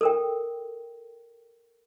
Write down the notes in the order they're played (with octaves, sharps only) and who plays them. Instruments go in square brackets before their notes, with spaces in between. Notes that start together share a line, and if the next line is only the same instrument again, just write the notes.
[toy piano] A4 A#4 G5